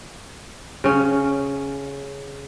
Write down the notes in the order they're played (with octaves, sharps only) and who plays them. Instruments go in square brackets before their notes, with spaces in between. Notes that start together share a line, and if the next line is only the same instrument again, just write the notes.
[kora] C#3 C#4